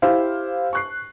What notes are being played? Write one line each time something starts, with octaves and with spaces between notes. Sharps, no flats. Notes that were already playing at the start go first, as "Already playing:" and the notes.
E4 G4 C5 F5
C#6 F#6 C7